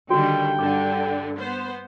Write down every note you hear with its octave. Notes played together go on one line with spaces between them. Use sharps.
D3 D#3 G3 F#4 G5
G2 D3 D6
B3 C5